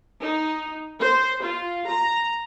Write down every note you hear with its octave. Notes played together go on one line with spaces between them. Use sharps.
D#4
C5
F4
A#5